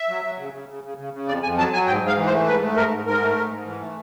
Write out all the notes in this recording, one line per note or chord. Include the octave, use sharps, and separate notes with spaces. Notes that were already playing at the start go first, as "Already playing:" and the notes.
Already playing: E5
F#3
F#3
C#3
C#3
C#3
C#3
C#3
C#3
F2 D5
F2 G#5
F#3 A5
F#3 G#5
G#2 G5
G#2 F5
E3
C5
A3
G#2 B4
A3
G#2 A#4
G#2
G#2 A#4
A3
G#2
G#2
E3
A3